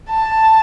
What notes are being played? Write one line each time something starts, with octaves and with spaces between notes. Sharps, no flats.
A5